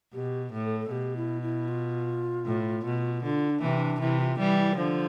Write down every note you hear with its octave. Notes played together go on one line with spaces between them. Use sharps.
B2 G4
A2
A4
A4
B2 G4
E4
E4
F4
A2
B2
D3 F4
D4
C3 E3
D4
C3 E3 E4
F4
E3 G3 E4
E4
D5
D3 F3 C5